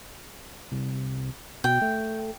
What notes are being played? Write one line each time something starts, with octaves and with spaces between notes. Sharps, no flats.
C2
B2 G5
A3